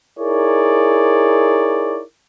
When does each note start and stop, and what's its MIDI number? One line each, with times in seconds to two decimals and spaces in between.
0.20 2.02 63
0.20 2.02 64
0.20 2.02 68
0.20 2.02 70
0.20 2.02 73
0.20 2.02 74